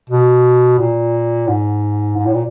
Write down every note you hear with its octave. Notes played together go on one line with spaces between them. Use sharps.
B2
A#2
G#2
G#2
A2
A#2